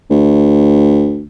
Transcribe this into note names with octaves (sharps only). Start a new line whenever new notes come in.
D2